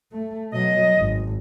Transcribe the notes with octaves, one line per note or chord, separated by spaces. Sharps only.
A3
B2 F#3 D#5
G#1